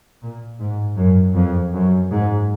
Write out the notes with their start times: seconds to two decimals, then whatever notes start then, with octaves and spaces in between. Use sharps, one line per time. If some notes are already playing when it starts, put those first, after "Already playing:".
0.22 A#2
0.60 G#2
0.97 F#2
1.35 F2
1.73 F#2
2.10 G#2